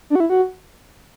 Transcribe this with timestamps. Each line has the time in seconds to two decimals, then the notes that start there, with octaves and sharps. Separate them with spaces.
0.10 D4
0.15 F#4
0.20 E4
0.30 F#4